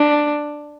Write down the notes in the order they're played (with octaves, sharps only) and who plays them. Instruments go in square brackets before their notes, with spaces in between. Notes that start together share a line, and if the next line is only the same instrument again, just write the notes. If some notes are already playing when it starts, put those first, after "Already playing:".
Already playing: [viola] D4